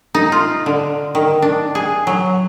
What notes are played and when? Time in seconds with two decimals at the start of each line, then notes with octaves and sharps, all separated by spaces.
0.14 D#4
0.32 F4
0.66 D3
1.15 D#3
1.42 D4
1.75 G#4
2.07 F#3